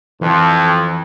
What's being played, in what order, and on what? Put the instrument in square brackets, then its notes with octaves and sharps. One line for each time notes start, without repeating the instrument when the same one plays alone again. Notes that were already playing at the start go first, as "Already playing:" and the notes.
[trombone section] F2 [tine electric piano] E3